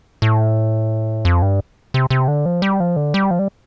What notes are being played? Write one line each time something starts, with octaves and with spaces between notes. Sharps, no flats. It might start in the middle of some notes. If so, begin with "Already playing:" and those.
A2
F2
G2
C3
C3
D3
F3
G3
F3
D3
G3
F3
G3